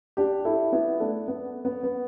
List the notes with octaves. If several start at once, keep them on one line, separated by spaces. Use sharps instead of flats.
D4 G4
E4 A4
B3 E4
A3 D4
B3
B3
B3